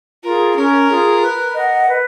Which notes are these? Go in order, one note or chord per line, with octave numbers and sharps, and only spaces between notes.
F4 G#4 A#4
C#4 A#4
F4 G#4
B4
D#5 F#5
B4